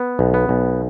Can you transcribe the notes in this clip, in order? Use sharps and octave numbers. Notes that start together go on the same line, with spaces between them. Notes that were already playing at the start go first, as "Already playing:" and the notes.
Already playing: B3
B1
B3
B1